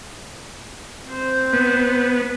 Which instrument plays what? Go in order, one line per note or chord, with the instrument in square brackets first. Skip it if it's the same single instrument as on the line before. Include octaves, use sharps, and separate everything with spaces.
[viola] C4 C5
[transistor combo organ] B3